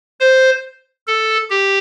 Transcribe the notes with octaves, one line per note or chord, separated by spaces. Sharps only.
C5
A4
G4